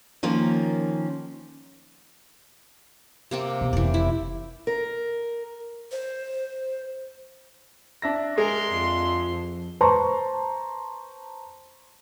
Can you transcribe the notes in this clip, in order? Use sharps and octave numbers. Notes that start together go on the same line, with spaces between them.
D#3 F3 A#3 C#4
C3 A#3 C4
B2 E3
F1 E3 D5
E4
A#4
C5
D4 E5 A#6
G#3 G#4 A#4 C6
F2 F3
B4 C5 A5 A#5 C6 C#6